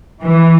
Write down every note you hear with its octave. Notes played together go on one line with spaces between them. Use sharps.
E3